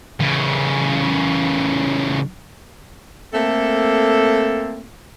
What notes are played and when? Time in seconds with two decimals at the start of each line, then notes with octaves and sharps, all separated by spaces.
0.20 C#3 E3
3.34 A3 A#3 C4 A4